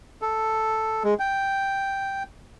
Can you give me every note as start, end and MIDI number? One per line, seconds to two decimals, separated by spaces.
0.22 1.03 69
1.04 1.14 56
1.19 2.23 79